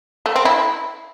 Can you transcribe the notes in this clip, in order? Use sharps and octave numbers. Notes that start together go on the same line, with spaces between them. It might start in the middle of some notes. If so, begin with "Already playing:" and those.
A3
C4
E4